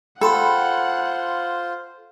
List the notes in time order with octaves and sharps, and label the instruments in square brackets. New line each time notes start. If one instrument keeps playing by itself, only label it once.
[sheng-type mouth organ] F4 C5 [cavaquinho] A4 [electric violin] F#5 [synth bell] G5 B5 C6